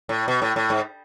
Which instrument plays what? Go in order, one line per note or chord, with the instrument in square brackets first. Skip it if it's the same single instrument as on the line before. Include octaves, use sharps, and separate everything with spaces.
[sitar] A2
B2
A2
A2
G#2